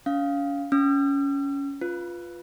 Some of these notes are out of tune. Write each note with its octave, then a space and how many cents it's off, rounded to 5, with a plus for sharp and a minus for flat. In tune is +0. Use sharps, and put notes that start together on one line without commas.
C#4 +40 F5 +0
C#4 +15 E6 +45
F4 +0 B4 +0